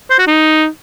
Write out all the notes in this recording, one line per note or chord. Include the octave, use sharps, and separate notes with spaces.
C5
F#4
D#4